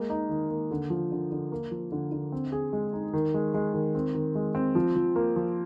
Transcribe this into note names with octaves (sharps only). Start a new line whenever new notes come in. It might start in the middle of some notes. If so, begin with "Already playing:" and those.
Already playing: G#3 A#3
D#4
D#3
A#3
D3
F3
D3
D3
A#3
F3
D3
D3
C4
G#4
G#3
D#4
D#3
G#3
G#3
D#3
C4
D#3
G#3
C4
F3
F3
A#3
F3